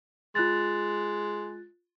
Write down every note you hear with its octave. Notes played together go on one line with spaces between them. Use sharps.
G#3 F4 F#6 A6